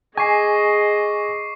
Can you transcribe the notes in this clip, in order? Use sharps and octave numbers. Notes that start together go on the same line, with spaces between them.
G#4 D#5 G#5 C#6 D6 C7